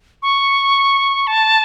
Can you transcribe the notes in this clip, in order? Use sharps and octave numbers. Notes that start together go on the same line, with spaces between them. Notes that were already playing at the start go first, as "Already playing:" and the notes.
C#6
A5